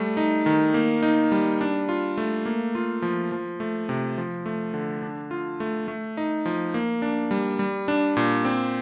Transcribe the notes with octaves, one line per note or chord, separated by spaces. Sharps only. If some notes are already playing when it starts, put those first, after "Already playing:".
Already playing: G3 A3
D#4
D#3
A#3
D#4
G3
D4
F4
A3
A#3
F4
F3
F3
A3
C3
F3
A3
D3
D4
F4
A3
A3
D#4
F3
A#3
D4
G3
G3
D4
A#2
C4